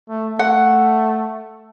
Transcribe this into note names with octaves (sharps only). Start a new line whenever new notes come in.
A3
A3 F#5